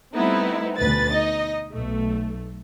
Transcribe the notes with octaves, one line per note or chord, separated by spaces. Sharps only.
G3 A3 B3 C4 D#4 E4
D2 B2 B4 A6
D#4 D#5
B1 A3